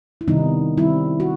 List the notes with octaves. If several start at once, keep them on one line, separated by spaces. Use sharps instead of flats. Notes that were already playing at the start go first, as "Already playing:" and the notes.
E4
C3 D#3 G3 B3 D#4
D#3 G3 C4 E4
F#4